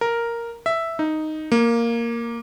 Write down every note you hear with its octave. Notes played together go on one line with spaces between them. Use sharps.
A#4
E5
D#4
A#3